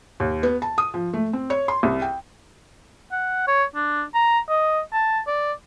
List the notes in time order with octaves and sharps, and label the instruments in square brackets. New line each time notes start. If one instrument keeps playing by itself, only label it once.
[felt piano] D#2
B3
A5
D#6
F3
A3
C4
C#5
C6
C2
G5
[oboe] F#5
C#5
D4
A#5
D#5
A5
D5